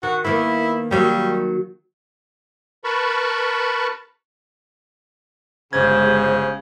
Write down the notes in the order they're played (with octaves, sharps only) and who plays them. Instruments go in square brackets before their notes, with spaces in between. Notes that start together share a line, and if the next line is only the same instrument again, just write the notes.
[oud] D#3 [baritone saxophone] F#4
[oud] D#3 A#3 B3 [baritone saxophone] E4
[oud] D#3 F#3 A#3 [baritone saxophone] G3
[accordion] A#4 B4 A5 B5 C#6
[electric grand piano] G1 G#6 [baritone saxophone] C#3 [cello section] G#3 G4 G#4 [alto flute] C5